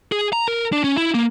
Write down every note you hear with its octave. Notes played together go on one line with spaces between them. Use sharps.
G#4
A#5
A#4
D4
C#4
E4
A#3